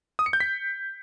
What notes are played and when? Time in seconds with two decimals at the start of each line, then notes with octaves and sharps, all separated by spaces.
0.19 D#6
0.26 C#7
0.33 G6
0.40 B6